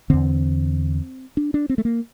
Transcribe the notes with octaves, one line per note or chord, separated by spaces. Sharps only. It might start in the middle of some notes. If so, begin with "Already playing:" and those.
E2 D3 C4
D4
D4
C4
A3
A#3